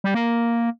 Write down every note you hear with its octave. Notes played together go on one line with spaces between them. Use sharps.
G3
A#3